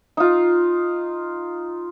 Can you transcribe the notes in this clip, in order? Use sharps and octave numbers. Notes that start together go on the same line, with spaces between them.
D#4 F4